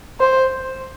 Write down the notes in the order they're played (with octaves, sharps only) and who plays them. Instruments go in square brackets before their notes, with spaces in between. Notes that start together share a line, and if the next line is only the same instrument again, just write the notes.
[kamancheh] C5